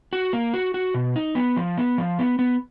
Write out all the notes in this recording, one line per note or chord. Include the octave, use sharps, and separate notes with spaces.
F#4
A#3
F#4
F#4
B2
D#4
B3
F3
B3
F3
B3
B3